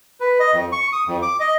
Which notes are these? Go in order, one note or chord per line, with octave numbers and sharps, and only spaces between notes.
B4
D#5
F2
C#6
D#6
F2
D6
D#5